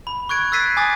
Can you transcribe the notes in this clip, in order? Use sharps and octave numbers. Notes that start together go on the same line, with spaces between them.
B5
C#6 F#6 G#6 D7
E6 F#6 A6 B6 C7 D#7
G#5 D6 D#6 A6